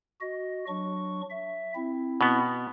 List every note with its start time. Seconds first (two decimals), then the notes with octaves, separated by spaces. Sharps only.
0.21 F#4 D#5
0.68 F#3 D4 C#6
1.30 E5
1.75 C4 E4
2.21 B2 B3